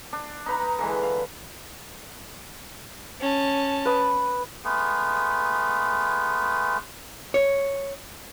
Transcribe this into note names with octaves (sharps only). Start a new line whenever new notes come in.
D4
D#4 B4 A#5
D3 E3 G#3
F5
C#4 A5
B4 D#6
G#3 A3 B3 G#4
C#5